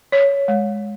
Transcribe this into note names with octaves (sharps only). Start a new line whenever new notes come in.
C#5
G#3